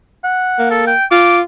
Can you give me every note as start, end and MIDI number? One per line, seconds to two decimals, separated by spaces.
0.24 0.67 78
0.59 0.92 58
0.71 0.85 69
0.87 1.05 79
1.11 1.42 65
1.11 1.38 86